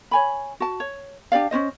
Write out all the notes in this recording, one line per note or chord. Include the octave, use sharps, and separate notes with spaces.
C#5 G#5 B5
F#4 A5
C#5
D4 G4 D5 F5
C#4 D4 C5 D#5